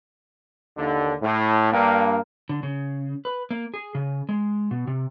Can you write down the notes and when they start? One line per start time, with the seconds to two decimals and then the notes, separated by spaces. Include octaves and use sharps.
0.77 D#2 D3
1.22 A2
1.72 G2 A#3
2.49 D3
2.63 C#3
3.25 B4
3.51 A#3
3.74 G#4
3.95 C#3
4.29 G#3
4.71 B2
4.87 C3